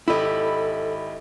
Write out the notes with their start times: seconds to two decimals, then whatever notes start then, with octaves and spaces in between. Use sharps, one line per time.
0.08 G#1 E4 G4 A4 D#5 B5